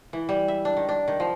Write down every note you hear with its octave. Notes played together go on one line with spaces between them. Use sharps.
E3
G3
E5
D4
D#3
D4
D#3
F3